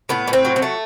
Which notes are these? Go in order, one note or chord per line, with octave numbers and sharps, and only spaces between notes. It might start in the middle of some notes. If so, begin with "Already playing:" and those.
A2 B3
A2
C4
F#3
C4
A3